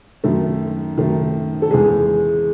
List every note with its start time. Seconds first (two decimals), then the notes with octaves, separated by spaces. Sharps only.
0.24 F#2 D#3 A3
0.98 F#2 D#3 A3
1.62 A4
1.71 E2 C#3 G#3 G#4